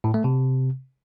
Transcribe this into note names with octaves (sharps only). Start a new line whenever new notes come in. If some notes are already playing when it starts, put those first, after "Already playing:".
A2
A3
C3